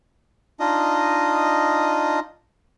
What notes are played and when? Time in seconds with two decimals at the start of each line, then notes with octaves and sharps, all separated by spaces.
0.60 D4 D#4 F4 D#5